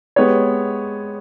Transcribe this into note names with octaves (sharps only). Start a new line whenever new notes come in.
G#3 B3 G4 C#5